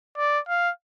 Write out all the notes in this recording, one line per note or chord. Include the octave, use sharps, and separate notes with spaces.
D5
F5